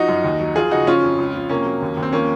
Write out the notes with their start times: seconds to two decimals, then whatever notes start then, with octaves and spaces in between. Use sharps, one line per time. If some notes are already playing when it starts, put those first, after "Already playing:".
Already playing: F3 D#4 F#4
0.09 F#2
0.24 D#2
0.40 F#3
0.55 F3 F4 G#4
0.71 C#3 D#4 F#4
0.86 F3 C#4 F4
1.03 F2
1.18 C#2
1.35 F3
1.49 C3 A#3 C#4
1.65 F#3
1.82 D#2
1.97 D#2
2.03 C4
2.13 F3 A#3 C#4